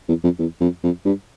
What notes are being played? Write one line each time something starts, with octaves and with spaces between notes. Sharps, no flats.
E2
F2
E2
F2
F2
G2